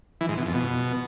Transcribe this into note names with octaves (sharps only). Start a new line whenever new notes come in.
E3
G#2
B2
F2
B2